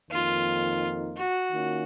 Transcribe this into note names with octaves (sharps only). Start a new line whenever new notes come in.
F2 D#3 A#3 D#4 F4
F#4
D#3 A#3 C#4 F4